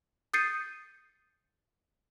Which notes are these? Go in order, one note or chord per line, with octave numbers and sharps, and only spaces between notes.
D#6 G6 A6 C7 C#7 D#7